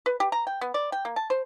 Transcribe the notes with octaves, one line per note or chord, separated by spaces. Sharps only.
B4
G4
A#5
G5
B3
D5
G5
A#3
A5
C5